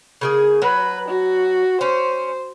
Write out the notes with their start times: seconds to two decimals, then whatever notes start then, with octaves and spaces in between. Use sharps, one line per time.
0.21 C#3 A#3 G#4
0.62 F#3 B4
1.08 F#4
1.81 C#4 C5